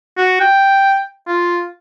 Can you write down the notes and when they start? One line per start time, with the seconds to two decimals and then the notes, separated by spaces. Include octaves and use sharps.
0.17 F#4
0.40 G5
1.27 F4